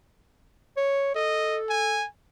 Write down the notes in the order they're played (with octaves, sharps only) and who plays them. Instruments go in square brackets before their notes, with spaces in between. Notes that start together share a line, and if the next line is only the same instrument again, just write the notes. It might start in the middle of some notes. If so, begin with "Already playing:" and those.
[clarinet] C#5
[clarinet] A4 [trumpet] D#5
[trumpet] G#5